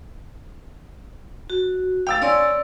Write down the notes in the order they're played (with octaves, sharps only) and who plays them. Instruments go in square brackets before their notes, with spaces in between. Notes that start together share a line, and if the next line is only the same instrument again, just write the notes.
[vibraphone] F#4
[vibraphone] F5 [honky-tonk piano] G5 E6 A6
[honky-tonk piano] C#4 [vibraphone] D5 C6 E6